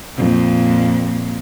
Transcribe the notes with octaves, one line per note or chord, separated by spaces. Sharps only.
F2 A#2